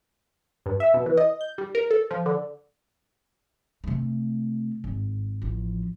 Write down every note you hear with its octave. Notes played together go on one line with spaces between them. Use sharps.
G2
E5
B2
E3
D#5
G6
G3
A#4
A4
F3
D3
C3 A3
G#1
A1 F3